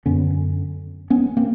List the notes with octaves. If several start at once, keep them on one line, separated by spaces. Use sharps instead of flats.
F#2 D3 B3 C#4
B3 C#4
A#3 C4